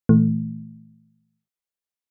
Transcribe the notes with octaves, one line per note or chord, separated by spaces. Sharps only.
A#2 E3 A3